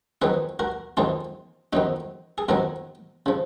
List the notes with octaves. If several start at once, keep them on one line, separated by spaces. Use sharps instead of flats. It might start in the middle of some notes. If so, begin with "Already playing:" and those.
F2 D#3 F#3 G#4 B4
F#4 A#4
F2 D#3 F#3 F4 G#4
F2 D#3 F#3 D#4 F#4
G#4
F2 D#3 F#3 F#4 A#4
C#3 F3